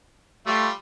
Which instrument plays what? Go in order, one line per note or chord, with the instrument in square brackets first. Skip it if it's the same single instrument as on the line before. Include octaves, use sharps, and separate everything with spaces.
[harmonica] G3 F4 [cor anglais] A3